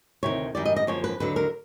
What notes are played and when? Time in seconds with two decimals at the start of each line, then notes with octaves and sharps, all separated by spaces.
0.23 D2 C3 D#3 C#5
0.55 F#2 D#3 G3 D5
0.65 D#5
0.76 D#5
0.87 F#2 D3 F3 A#3 C#5
1.04 B4
1.20 D#2 D3 F#3 B4
1.36 A#4